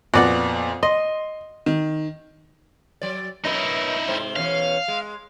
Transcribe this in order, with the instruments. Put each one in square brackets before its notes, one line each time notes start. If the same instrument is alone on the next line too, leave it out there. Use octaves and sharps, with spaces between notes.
[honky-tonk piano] F2 A#2 B3 [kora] F#4 D5 F#5
[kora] D#5 [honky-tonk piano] C6
[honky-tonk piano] D#3
[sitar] F#3 D5
[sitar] F#2 B2 D#5 [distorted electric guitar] D#4 E4
[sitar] G#2 C3 C4
[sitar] E2 B2 C#4 [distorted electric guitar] F5
[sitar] G#3